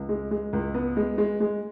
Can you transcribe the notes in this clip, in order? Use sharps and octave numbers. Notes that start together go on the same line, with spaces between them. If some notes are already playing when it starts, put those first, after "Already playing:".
Already playing: C#2
G#3
G#3
C#2
B3
G#3
G#3
G#3